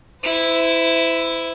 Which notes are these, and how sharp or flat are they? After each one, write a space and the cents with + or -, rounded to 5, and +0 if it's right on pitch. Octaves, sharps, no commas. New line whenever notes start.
E4 +0 C5 -35